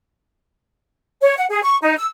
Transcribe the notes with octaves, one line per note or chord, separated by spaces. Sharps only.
C#5
F#5
G#4
C#6
D#4
E6